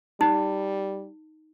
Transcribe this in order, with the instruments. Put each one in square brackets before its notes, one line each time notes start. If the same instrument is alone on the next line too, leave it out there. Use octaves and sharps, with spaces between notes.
[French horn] G3 [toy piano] D#4